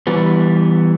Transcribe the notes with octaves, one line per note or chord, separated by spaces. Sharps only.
E3 G3 B3